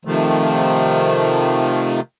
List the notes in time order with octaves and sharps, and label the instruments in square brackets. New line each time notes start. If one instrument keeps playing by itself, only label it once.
[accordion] C3 D#3 F3 A3